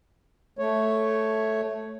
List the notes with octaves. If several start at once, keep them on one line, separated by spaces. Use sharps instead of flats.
A3 C#5